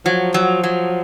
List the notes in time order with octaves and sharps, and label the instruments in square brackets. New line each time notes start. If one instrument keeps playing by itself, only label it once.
[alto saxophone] F3 [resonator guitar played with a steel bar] F#3
[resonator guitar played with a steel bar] F#3
F#3